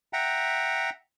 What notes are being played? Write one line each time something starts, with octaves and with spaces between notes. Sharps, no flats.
E5 F#5 G5 A#5